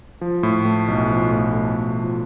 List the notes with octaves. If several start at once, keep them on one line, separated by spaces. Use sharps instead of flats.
F3
A2
A3
B1
F3
A2
A3
B1
F3